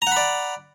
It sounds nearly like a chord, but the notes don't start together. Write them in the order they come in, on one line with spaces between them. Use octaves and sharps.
A#5 F#5 B5 D5